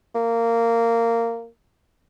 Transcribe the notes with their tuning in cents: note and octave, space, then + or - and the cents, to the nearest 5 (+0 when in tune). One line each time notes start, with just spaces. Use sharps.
A#3 -15